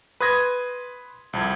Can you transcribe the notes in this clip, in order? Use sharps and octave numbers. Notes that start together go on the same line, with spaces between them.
B4 C6 D#6 G#6 A#6
C2 F2 G#6